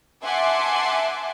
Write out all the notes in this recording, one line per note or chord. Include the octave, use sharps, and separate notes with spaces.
E5 F#5 G#5 A5 C6 D6